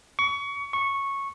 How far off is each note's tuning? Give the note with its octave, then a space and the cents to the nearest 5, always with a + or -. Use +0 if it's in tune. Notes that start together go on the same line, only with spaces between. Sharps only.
C#6 +25
C#6 -10